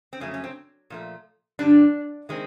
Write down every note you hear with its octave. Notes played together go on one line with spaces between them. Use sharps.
C4
F2 C#3 F#3 A3 C#4
C#4
C4
A#2 F3 A3
G2 D3 G3 D4
D#3 G#3 C4